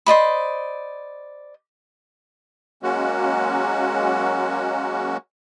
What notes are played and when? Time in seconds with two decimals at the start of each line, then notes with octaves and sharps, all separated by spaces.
0.06 C5 D5 D#5 B5
2.83 F#3 G#3 A#3 C#4 F#4